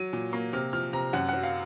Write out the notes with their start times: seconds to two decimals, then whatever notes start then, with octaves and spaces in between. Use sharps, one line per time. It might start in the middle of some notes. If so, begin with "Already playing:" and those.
Already playing: F#3 D#7
0.13 A#2
0.33 A#3
0.53 C3 F6
0.73 F3 F6
0.93 C3 A#5
1.13 F#2 F#5
1.29 F#3 F#5
1.43 F5